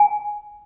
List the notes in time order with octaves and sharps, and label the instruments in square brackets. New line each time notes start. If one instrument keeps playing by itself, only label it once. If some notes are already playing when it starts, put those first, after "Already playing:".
Already playing: [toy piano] G#5